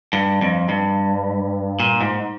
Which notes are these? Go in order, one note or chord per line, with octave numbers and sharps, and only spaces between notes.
G2
F2
G2
A#2
G#2